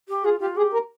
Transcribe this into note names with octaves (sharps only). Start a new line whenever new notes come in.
G4
F4 G#4
F4 G4
G4 G#4
A#4